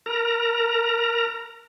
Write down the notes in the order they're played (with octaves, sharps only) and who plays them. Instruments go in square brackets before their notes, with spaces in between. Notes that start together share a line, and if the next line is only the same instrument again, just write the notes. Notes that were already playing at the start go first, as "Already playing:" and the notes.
[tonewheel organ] A#4 A#5